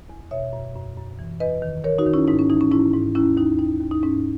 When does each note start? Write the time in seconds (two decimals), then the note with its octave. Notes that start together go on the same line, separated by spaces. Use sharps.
0.10 E2
0.31 B2 C#5 E5
0.53 F#2
0.75 F#2
0.97 F#2
1.19 E3
1.40 E2 B4 D#5
1.62 D#3
1.84 D#3 A#4 C#5
1.98 D#4 F#4
2.06 D#3
2.14 C#4 E4
2.28 G#2 D#4
2.39 C#4
2.49 E3 D#4
2.61 C#4
2.72 G#2 C#4 E4
2.93 G#2
3.15 D#2 C#4 E4
3.37 D#2 D#4
3.59 D#2 D#4
3.81 D#2
3.91 D#4
4.03 G#2 C#4